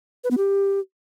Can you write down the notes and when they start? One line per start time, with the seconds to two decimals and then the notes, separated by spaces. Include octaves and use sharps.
0.24 B4
0.31 B3
0.38 G4